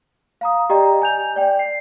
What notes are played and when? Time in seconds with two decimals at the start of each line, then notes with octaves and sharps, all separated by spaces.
0.41 F5 A#5 D#6
0.70 G4 D5 D#5 G5 A#5
1.02 G#5 G6 F7
1.36 D5 G5
1.59 C7